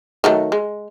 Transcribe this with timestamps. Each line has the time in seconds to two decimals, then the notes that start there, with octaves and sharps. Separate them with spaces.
0.24 D#3 F#3 A3
0.52 G#3